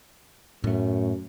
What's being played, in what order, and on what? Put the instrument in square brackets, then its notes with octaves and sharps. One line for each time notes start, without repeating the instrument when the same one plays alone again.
[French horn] F#2 [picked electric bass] A2 A3